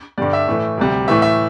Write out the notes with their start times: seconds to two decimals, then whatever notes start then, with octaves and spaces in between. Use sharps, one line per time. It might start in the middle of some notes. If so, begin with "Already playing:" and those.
0.18 G2 D3 G3 D5
0.33 E5
0.48 A2 E3 A3
0.77 D2 C3 G3
1.07 A2 E3 A3 E5
1.22 E5